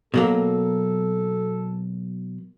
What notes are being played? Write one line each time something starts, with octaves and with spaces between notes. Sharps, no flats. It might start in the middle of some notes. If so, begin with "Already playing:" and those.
B2 F#3 A#3 A4